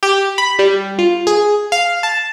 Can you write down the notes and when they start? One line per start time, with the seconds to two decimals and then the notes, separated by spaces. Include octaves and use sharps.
0.03 G4
0.38 B5
0.59 G3
0.99 F4
1.27 G#4
1.72 F5
2.03 A5